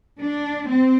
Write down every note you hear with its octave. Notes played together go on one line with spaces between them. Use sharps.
D4
C4